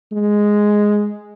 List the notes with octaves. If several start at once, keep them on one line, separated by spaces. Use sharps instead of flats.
G#3